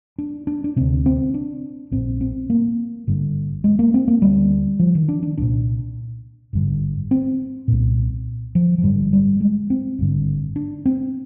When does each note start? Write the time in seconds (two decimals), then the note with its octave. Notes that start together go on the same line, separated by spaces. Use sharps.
0.18 D4
0.47 D4
0.64 D4
0.76 D2 C3 C4
1.06 C4
1.34 D4
1.91 A#1 A#2 C4
2.21 C4
2.50 A#3
3.07 G1 G2 D3
3.64 G#3
3.79 A#3
3.94 C4
4.08 A#3
4.22 D2 D3 G3
4.80 F3
4.95 D#3
5.08 D4
5.23 D4
5.38 C2 A#2 D4
6.53 G#1 G2 D3
7.11 C4
7.68 C2 A#2
8.55 F3
8.78 F3
8.82 G#1 G2 D3 G3
9.13 G3
9.40 G#3
9.70 C4
9.99 G#1 G2 D3
10.56 D4
10.85 C4